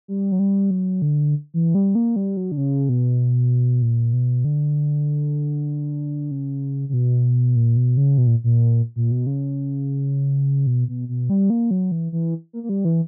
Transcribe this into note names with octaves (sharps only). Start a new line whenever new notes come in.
G3
F#3
G3
F#3
D3
E3
G3
A#3
G3
F#3
D3
C#3
B2
A#2
B2
D3
C#3
C#3
B2
A#2
B2
C#3
B2
A#2
A#2
A#2
B2
C#3
B2
B2
B2
G3
A#3
F#3
E3
E3
A#3
A#3
G3
E3